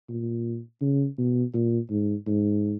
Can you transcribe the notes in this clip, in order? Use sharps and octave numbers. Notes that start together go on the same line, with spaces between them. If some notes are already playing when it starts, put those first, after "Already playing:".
A#2
C#3
B2
A#2
G#2
G#2